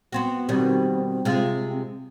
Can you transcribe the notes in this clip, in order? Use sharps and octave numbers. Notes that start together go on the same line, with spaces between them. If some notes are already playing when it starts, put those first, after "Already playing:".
B3 C4 F#4
B2 D#3 G3 C4
C3 G#3 F4